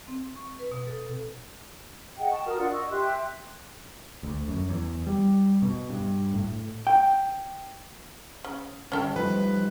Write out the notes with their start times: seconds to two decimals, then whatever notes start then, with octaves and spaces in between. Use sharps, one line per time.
0.08 C4
0.36 C#6
0.59 B4
0.72 B2
0.87 A4
2.18 G#4 D#5 F#5 G5
2.31 A5 C#6
2.46 F#4 A#4 D#6 F6
2.57 D4 F4 D5 F#5
2.71 D#5 C#6 E6
2.90 G4 E5 C6 F#6
4.23 D2
4.48 F#2
4.70 E2
5.07 G3
5.62 B2
5.89 G2
6.34 A2
6.87 G5
8.44 C#3
8.92 G1 C#2 C#4 A4 G5
9.16 F3 A3 D#4 B4